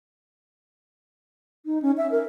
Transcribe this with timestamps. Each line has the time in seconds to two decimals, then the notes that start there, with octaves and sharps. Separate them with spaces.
1.66 D#4
1.82 C#4
1.98 E5
2.11 A#4